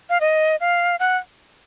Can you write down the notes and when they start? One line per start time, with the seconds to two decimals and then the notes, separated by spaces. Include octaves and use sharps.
0.10 F5
0.20 D#5
0.60 F5
0.99 F#5